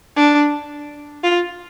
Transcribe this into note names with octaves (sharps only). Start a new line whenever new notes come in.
D4
F4